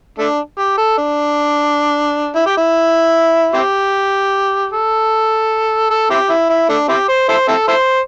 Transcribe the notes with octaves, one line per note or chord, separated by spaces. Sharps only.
A3 D4
G4
A4
D4
E4
G4
E4
C4 E4 G4
A4
A4
C4 E4 G4
E4
E4
A3 D4
C4 E4 G4
C5
E4 A4 C5
C4 E4 A4
E4 A4 C5